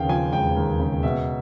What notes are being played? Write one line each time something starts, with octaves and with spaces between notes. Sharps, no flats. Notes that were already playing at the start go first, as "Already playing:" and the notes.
Already playing: D#2 C#3 F5 G5
F3 G#5
E1 G5
D#2
C#3
B2 E5